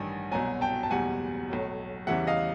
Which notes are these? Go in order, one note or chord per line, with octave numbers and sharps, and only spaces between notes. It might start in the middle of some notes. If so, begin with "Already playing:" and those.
Already playing: A1 G2 D#3 G#5
C2 B2 F#3 G#5 A#5
G5 A5
A5
F#1 E2 B2 G3 F#5 G#5
B1 A2 F#3
E2 C#3 E3 G3 E5 F#5
D#5 F5